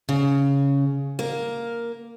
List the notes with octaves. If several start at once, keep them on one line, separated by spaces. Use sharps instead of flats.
C#3
A#3